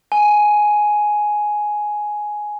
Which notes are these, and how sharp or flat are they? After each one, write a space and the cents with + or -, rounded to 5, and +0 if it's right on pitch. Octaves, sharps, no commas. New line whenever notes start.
G#5 +10